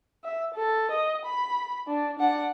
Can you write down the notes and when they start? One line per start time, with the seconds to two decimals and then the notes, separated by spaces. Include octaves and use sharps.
0.24 E5
0.54 A4
0.91 D#5
1.25 B5
1.87 D4
2.19 D4 F#5